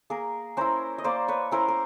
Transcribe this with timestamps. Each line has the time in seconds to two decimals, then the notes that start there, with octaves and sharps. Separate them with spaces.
0.10 A#3 G#4 A#4
0.57 C#4 E4 A#4 C5
0.98 D#5
1.04 A#3 C5 D5
1.28 B4 C#5
1.51 C#4 E4 A#4 C5
1.68 A#4